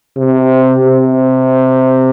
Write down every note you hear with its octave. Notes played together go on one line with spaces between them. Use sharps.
C3
C3